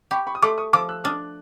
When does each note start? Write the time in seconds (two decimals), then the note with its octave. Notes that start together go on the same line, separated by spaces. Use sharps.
0.11 G4 B5 C#6
0.27 B5 C#6
0.35 D#6
0.42 A3 C6 D6
0.58 C#6 D#6
0.73 F3 D6 E6
0.89 E6 F#6
1.04 D4 D#6 F6